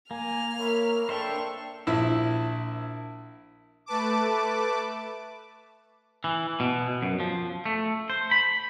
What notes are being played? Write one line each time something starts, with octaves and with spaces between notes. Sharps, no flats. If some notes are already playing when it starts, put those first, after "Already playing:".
A#3 G#5 F6
A#4 C#5 E5 B5
D4 A4 C5 E5 G5 C#6
A#1 E4
A3 B4 A5 D6
E3
B2
F#2
F3
A3
C5
B5